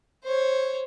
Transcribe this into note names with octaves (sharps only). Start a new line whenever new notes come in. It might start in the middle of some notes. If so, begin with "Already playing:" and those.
C5 C#5